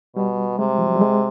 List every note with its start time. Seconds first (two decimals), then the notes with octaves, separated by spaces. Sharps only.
0.16 B2 G3
0.58 C3 G#3
0.78 F3
0.87 F#3
0.96 G3
1.01 G#3